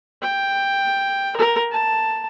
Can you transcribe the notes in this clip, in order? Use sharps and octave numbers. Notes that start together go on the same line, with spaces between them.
G5
A#4
A5